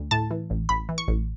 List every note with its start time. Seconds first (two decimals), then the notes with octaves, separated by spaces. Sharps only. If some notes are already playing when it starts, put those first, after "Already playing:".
Already playing: D2
0.11 A2 A5
0.31 E3
0.50 A1
0.69 A1 B5
0.89 E3
0.98 C#6
1.08 A1